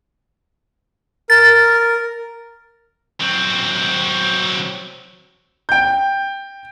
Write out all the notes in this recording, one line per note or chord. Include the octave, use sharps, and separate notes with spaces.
A#4 A6
F#3 C4
G5 G6